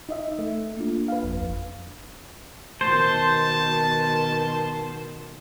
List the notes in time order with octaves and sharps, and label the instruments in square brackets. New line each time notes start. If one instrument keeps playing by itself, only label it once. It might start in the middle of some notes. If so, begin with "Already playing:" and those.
[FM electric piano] D#4 D#5 E5
A3
[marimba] A#3 D4 F4
[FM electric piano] B4 F5
G1 F2
[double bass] B2 D#3 [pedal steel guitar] C5 [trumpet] A5